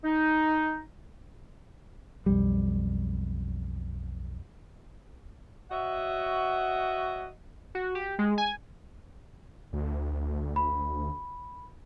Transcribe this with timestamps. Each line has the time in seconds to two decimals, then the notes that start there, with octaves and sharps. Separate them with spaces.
0.04 D#4
2.26 B1 F2 G3
5.71 F#4 C#5 D#5 E5 F#5
7.75 F#4
7.95 G4
8.19 G#3
8.38 G#5
9.73 D2
10.56 B5